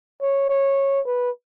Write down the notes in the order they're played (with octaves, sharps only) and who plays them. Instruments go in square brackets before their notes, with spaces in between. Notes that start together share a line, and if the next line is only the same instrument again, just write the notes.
[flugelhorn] C#5
C#5
B4